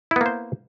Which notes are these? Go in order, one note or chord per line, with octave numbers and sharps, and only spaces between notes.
A#3 B3 E4 C5